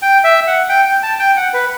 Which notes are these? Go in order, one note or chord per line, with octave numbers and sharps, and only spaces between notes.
G5
E5
F#5
G5
G5
A5
G5
F#5
B4